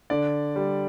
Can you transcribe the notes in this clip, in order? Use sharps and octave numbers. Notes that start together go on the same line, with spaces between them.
D3 D5
G3